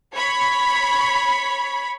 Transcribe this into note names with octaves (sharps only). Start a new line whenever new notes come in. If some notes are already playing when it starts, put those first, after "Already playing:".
C#5 B5